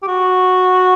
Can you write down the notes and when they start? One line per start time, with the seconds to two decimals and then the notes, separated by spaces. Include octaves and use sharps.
0.03 G4
0.08 F#4